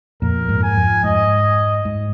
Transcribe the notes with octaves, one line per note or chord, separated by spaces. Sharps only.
F2 A#2 A#4
G#2
G#5
F2
G#2 D#5
G#2